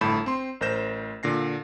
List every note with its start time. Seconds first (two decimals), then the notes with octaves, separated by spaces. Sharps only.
0.01 G1 A2 A5 B5 G6 E7
0.26 C4 C6
0.61 A1 A#4 C5 G6 A#6 E7
1.23 A#2 D3 A#6 C7